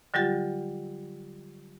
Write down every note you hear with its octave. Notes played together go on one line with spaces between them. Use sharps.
D3 F#3 G3 F4 G4 A6